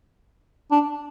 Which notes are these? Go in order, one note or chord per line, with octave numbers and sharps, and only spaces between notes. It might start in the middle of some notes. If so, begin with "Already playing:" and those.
D4